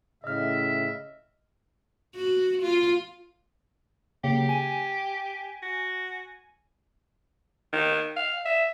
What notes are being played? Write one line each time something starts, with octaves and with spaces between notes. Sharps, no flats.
A2 C#3 D#5 E5 F6
F#4
F4
C#3 F#3 A#3 G4
G#5
F#4
D#3
F5
E5